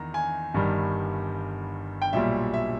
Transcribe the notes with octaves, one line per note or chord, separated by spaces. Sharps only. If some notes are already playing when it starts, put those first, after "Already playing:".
Already playing: E2 D#3 A#5
G#5
G1 G2 D#3 G3
G5
B1 A#2 G3 E5
E5